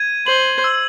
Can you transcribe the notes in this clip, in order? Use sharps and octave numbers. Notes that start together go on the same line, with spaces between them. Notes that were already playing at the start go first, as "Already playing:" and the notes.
Already playing: G#6 D#7
C5 F#7
E6